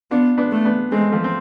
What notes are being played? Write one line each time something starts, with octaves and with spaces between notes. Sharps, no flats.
B3 D4 F4
B3 D4
A3
B3 D4
G#3 A3 C4
F3 A3
C4